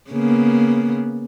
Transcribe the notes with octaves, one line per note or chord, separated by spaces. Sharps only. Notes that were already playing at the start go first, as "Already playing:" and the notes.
C#3 A#3 B3